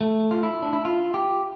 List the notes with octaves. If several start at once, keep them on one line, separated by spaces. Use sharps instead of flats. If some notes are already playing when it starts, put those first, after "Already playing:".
A3
F4
E4
D4
E4
F4
G4